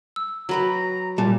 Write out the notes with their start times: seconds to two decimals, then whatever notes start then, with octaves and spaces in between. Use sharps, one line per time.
0.16 E6
0.49 F#3 B4 G5 A#5
1.18 A#2 G3 A5